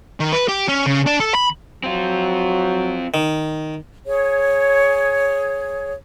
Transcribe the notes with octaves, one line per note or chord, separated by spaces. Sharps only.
D#3
B4
G4
C#4
C#3
D4
A4
B5
F#3 C4 F4
D#3
G#4 C#5